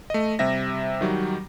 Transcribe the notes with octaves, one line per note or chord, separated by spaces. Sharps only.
A3 D#5
C3 G3 E5 A#6
D#3 F#3 G3